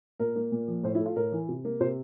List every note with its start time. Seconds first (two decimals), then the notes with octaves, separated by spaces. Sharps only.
0.20 A#2 A#4
0.36 A#3
0.52 A#2
0.68 F3
0.83 A2 C5
0.95 E4
1.00 A3
1.06 F4
1.16 A2 A#4
1.32 E3
1.49 C3
1.65 A#3
1.80 C3 C5